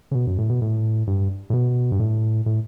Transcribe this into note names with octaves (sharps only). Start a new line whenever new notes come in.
C#3
B2
F#2
A2
B2
A2
G2
A2
B2
G2
A2
A2